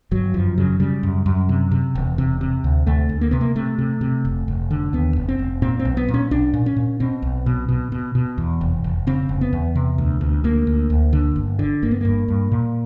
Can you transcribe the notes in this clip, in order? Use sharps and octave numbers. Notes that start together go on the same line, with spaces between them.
G1 F#3
F#2 F3
C#3 F#3
C#3 G3
F#2
F#2
C3
C3
E1
C3
C3
D2
D2 A3
D2
A#3
C3 B3
A#3
C3 A3
C3
C3
F1
F1
D3
D#2 B3
F1
C4
F1
A#2 C4
C4
B1
B3
A#2
C#4
B1 D4
A#2
C#4
A#2
B2 C4
B1
B2
B2
B2
B2
E2
F1
F1
C#3 C4
F1
B3
E2
C3
D2
D2
D2 A#3
D2
D2
D3
G1
D3
G1 A#3
B3
G2 A#3
G2
A#2